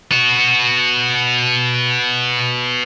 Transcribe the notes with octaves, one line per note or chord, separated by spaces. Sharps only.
B3 F#4